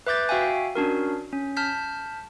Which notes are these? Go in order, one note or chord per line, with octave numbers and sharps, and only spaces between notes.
B4 E5 D6 G6 A6
F#4 E5 F5 G5 G#5
C#4 D4 F#4 A#4
C#4
A5 F6 G6 B6